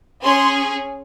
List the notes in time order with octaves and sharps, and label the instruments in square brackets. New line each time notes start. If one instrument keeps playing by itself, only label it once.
[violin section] C#4 G#4 C6